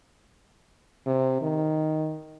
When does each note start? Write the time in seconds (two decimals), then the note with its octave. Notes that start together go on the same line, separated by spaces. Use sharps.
1.06 C3
1.42 D#3